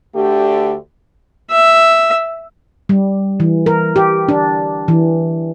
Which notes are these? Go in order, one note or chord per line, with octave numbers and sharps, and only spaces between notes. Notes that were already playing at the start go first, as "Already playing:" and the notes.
D2 D3 A3 G4
E5
G3
E3
A#4
G4
D4
E3